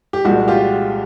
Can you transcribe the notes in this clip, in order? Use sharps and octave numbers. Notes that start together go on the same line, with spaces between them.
G4
C2 A#2 F3 G#3 F#4
F4 G4